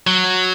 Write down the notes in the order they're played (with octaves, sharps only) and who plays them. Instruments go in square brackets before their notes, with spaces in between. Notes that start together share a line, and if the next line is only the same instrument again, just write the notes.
[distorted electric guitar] F#3